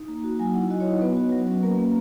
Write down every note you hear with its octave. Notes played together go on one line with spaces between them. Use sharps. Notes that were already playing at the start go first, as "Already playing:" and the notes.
Already playing: D#4
A#3
F#4
F#3 G#5
E4 F#5
F#4 D#5
C#5
D#4
B3 B4
F#4
F#3
C#4
A#3 A#4
A#3